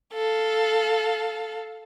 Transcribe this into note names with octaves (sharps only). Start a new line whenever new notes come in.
A4 F5